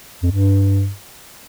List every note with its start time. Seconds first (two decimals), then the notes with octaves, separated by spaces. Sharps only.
0.23 F2
0.31 G2